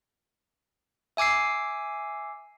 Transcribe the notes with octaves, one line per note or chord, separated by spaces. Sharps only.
E5 G#5 D6 E6 C7